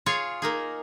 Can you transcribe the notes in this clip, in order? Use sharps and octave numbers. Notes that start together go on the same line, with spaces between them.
F4 G#4 C#5 F5
A#3 D#4 G#4